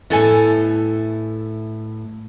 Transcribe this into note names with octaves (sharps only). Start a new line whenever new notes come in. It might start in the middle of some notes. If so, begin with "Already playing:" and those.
A2 B3 E4 A4 G#5